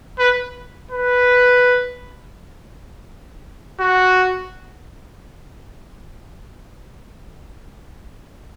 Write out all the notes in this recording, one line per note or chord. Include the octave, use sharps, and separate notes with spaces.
B4
B4
F#4